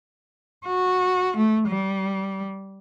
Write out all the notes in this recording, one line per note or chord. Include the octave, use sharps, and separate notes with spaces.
F#4
A3
G3